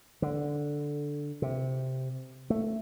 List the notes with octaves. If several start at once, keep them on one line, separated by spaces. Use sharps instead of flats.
D3
C3
A3